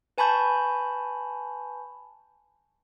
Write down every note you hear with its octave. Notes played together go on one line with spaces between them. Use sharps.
B4 G#5 A5 B5 C#6 G6